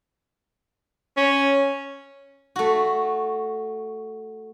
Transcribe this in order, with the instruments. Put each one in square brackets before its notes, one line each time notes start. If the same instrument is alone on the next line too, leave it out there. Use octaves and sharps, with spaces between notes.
[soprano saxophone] C#4
[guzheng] A3 F#4